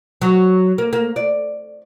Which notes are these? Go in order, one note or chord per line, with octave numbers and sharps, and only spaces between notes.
F#3
A#3
A#3
D5